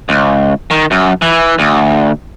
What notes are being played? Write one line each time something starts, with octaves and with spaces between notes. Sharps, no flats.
C#2
D#3
F#2
E3
D2